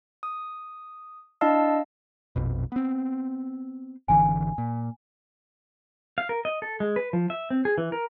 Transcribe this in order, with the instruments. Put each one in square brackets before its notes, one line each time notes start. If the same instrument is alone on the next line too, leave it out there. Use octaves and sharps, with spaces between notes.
[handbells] D#6
D4 E4 D#5 F5 A5 E6
[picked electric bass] A#1 F2 B2
B3 C4
[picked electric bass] G#1 D3 E3 [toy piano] G#5
[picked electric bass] A#2
[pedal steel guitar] F5
A#4
D#5
A4
G#3
B4
F3
E5
C4
G#4
E3
A#4